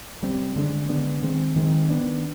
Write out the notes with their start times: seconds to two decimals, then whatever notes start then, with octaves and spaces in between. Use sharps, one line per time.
0.22 C3 G3 C4
0.56 D3 G#3 B3 D4
0.89 D3 G#3 B3 D4
1.22 D#3 G#3 C4
1.56 D#3 G#3 C4
1.89 D#3 B3 D4